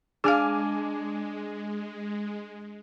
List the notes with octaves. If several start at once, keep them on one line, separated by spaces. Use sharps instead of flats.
G#3 D4 G#4 F5 G#5 D6 F6